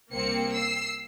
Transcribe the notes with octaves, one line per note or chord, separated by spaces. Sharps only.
C2 A#3 C4 C#7
E6 C7